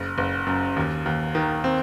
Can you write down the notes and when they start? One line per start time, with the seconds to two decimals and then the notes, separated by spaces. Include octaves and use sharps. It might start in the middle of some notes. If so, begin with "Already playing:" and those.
Already playing: F#1
0.18 F#1
0.47 F#2
0.76 D#2
1.06 D#2
1.35 D#3
1.64 C4